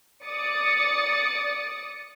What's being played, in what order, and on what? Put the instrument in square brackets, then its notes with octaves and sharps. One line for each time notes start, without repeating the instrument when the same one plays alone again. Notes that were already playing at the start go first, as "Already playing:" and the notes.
[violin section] D5 D#6 A6 C#7